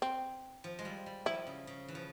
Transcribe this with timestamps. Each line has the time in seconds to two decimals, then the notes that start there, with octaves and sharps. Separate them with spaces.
0.02 C4
0.64 F3
0.79 G#3
0.85 G3
1.06 G3
1.26 F3 E4
1.47 C#3
1.67 C#3
1.88 E3
1.95 F3